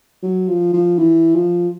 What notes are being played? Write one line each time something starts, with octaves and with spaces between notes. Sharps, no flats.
F#3
F3
F3
E3
F3